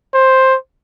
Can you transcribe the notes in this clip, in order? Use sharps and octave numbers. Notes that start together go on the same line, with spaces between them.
C5